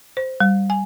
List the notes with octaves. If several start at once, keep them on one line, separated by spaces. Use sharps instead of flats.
C5
G3
G#5